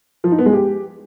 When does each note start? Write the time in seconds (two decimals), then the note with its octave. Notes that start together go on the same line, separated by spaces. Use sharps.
0.24 F3
0.31 D#4
0.38 B3
0.46 G#3
0.53 G4